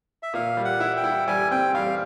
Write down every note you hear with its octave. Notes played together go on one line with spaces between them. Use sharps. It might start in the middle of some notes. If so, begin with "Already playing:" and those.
E5
A#2 F5
G3
F#5
E4
G5
E4
G3 G#5
C4 G5
G3 F5